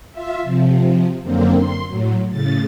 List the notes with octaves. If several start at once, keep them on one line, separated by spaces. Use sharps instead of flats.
F4 E5
C3 F3
F#2 D3 A#3 C4
C6
A2 F#3
A2 C#3 A6